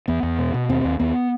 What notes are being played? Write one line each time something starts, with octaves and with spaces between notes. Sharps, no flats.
E2 B3
E2
B2
B2
D#2 C4
D#2
D#2 B3